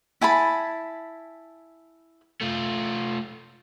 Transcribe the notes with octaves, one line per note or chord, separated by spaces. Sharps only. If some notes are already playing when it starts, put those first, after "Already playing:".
E4 G#5 A5 B5
A3 F4